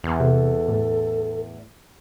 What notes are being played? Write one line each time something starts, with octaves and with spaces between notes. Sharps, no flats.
E2
C3 A4
A2